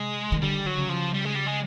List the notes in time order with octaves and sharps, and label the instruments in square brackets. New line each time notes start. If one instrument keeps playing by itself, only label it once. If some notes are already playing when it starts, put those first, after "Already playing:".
Already playing: [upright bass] C3 [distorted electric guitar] G#3
[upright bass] D#3
[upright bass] D3 [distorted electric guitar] G3
[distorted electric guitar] F#3
[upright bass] C#3
[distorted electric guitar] F3
G3
G#3
G3
G#3